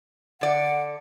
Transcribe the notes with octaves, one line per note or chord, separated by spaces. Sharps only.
D3 D5 F#5